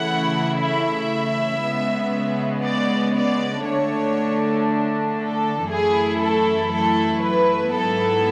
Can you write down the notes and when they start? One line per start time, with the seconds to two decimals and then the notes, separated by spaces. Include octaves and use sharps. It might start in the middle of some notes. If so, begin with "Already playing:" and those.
Already playing: C#3 E3 A3 E4 F#5
0.60 E5
1.61 C#3 G#3 B3
2.63 D5
3.15 D5
3.66 D3 A3 D4 C#5
5.19 A4
5.69 F#2 E3 A3 E4 G#4
6.21 A4
6.71 A4
7.23 B4
7.73 G#2 F#3 B3 E4 A4